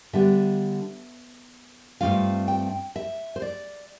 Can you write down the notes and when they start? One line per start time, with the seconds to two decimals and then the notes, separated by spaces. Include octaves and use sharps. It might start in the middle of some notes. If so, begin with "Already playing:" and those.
0.13 D3 G3 B3 E5
2.01 G2 D3 A3 C4 F4 F5
2.48 G5
2.96 E5
3.36 C5
3.42 D5